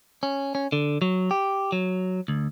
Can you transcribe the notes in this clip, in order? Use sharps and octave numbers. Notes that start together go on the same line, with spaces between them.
C#4
C#4
D3
F#3
G4
F#3
D2